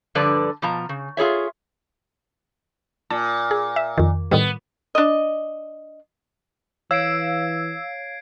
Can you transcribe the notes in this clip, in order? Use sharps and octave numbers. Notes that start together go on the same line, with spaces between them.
G2 D3 F3 B4 D5
B2 F3 A#5
C#3
F4 G#4 C#5 E5
A#2 A5
G#4
E5
F2 D#3
A2 D#3 G3 B3
D4 D#5
E3 C#5 F5 E6 G#6 C7 D7